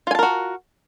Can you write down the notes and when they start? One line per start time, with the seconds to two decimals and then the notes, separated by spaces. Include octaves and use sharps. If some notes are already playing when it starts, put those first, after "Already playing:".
0.07 F4
0.11 G#5
0.15 A5
0.19 A#4
0.23 F#4